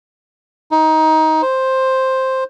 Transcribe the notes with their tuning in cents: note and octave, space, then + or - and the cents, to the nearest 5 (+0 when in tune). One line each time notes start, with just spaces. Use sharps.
D#4 +20
C5 +5